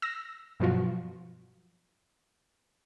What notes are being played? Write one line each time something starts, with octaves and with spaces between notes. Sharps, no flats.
E6 A#6
G2 B2 F3 F#3 F4 F#4